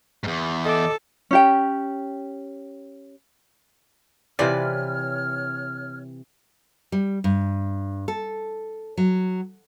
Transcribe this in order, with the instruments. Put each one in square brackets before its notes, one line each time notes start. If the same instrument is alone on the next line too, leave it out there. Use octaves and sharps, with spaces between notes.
[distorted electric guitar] E2 G#2
[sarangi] A4 [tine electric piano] D#5 D6
[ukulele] C#4 G4 G5
[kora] C3 E3 B4 [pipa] F3 C4 D5 [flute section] C#5 F6
[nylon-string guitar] G3
G2
A4
F#3